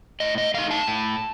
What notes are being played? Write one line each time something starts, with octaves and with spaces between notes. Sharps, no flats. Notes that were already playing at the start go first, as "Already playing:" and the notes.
A2 D#5
D#5
A3 D#4 F5
A5
A2